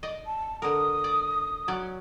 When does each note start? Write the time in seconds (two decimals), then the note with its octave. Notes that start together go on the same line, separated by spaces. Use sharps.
0.03 D5 D#5
0.26 A5
0.62 D3 A#4 D#6
1.04 D5
1.68 F#3 C#4 D5